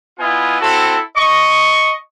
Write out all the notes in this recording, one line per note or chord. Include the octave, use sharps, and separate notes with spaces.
B3 E4 F4 D#5 G#5
C4 E4 F#4 A4 A5
D#5 C#6